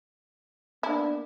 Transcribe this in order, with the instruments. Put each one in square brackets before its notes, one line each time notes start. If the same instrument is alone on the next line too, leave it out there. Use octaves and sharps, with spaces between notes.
[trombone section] A#3 B3 D4 [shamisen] E4